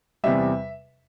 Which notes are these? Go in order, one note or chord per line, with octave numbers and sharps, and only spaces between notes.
E2 C3 G3 E5